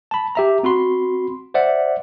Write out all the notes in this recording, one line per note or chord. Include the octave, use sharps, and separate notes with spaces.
A5 B5
G4 E5 A#5
C4 F#4 B5 C6
C5 D5 E5 F#5